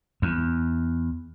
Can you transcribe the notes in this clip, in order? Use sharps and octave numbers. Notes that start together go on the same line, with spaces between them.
E2